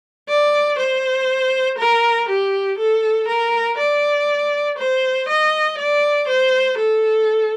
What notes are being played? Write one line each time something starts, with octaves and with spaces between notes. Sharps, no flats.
D5
C5
A#4
G4
A4
A#4
D5
C5
D#5
D5
C5
A4